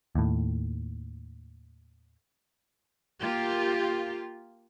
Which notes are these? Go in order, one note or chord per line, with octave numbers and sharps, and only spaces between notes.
D#2 A2
A#3 F4 G4